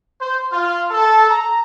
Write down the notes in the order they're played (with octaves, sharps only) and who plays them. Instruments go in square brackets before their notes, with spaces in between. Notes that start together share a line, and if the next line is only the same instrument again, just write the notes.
[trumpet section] C5
F4
A4
A#5